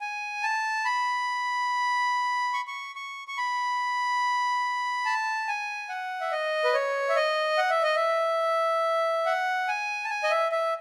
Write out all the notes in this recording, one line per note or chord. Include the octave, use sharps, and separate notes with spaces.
G#5
A5
B5
C#6
C#6
C#6
C#6
B5
A5
G#5
F#5
E5
D#5
B4
C#5
E5
D#5
F#5
E5
D#5
E5
F#5
G#5
A5
G#5
D#5
E5
E5